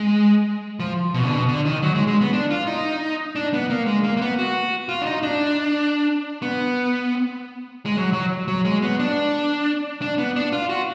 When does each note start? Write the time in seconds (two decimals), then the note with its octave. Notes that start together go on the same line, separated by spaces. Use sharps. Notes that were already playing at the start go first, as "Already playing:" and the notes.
Already playing: G#3
0.80 F3
1.14 B2
1.24 D3
1.31 B2
1.48 D3
1.65 D#3
1.83 F#3
1.95 G#3
2.07 G#3
2.21 B3
2.33 D4
2.50 F4
2.67 D#4
3.35 D4
3.53 B3
3.70 A#3
3.86 G#3
4.04 A#3
4.17 A#3
4.21 B3
4.39 F#4
4.89 F4
5.02 D4
5.06 D#4
5.23 D4
6.42 B3
7.86 G#3
7.97 F#3
8.13 F#3
8.48 F#3
8.65 G#3
8.82 B3
9.00 D4
10.02 D4
10.18 B3
10.36 D4
10.52 F4
10.69 F#4